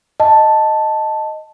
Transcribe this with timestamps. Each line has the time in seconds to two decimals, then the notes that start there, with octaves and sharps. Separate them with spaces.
0.20 D#5 A5